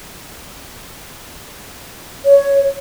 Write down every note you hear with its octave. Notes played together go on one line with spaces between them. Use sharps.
C#5